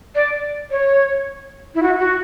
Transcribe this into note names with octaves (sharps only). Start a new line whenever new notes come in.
D5
C#5
E4
F#4
F#4